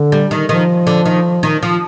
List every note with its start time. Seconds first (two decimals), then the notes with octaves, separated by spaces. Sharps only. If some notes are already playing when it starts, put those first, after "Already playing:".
Already playing: D3
0.12 G3
0.31 D#3
0.49 D#3 F3
0.87 D3
1.06 D#3
1.43 D#3
1.63 F3